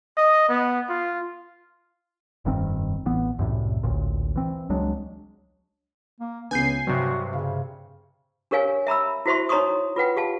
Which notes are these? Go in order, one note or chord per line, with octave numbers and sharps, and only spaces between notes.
D#5
B3
F4
F1 G2 D#3 C4
A1 E3 B3
C2 F#2 A2 C3
A1 D2 A#2
E3 C4
C#2 F#3 G#3 D4
A#3
C#2 C#3 B3 G#5 G6 C7
G2 C3 F#3 F#4
C#3 F5
D4 G4 A#4 C#5 F5 G#5
E5 A#5 B5 E6
E4 F#4 C5 E5 C6 C#6
D#4 C#5 A#5 C6 C#6 D#6
F4 B4 F#5 G5
G4 F5 A5